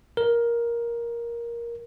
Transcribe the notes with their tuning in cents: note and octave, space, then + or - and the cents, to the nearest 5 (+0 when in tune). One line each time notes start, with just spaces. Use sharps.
A#4 +10